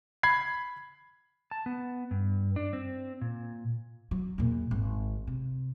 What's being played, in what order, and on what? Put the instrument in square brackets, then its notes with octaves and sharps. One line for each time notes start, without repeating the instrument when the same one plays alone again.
[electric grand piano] B5 G#6 C7
[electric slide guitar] A5
B3
G2
D4
C4
A#2
[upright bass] F#3
E2 A#2
G#1
C3